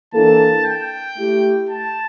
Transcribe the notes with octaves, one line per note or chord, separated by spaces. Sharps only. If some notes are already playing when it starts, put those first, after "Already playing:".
E3 A#3 D4 A4 A5
G5
A3 E4 G4
A5